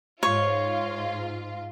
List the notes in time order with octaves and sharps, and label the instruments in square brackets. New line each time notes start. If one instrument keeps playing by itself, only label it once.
[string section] G#2 F4 [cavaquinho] C#5